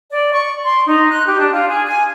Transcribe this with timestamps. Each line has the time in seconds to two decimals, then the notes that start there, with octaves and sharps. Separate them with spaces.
0.11 D5
0.33 C#6
0.64 C6
0.86 D#4
1.10 F#6
1.27 G4
1.39 D4
1.51 F4
1.69 G#4
1.86 G#5